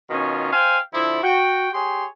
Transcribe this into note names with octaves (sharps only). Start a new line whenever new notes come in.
B2 D#3 C#4 F4
C5 F5 G5 G#5
D3 F3 E4
F#4 G5
G4 G#4 C#5 C6